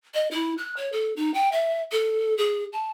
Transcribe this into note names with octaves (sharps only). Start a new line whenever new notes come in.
D#5
E4
F#6
C#5
A4
D#4
G5
E5
A4
G#4
A5